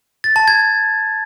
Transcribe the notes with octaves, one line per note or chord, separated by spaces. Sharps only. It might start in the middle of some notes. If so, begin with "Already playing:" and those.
A6
A5
G#6